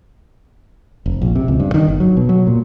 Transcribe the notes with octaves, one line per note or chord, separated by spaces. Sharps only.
F1
A#1
C3
C#2
G2
D#3
G1
F#3
B2
F#3
A#2